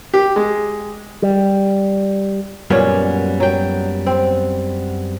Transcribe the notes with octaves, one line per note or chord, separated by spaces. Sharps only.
G4
G#3
G3
F#2 A#2 G3 B3 C#4
F#3 G5
C4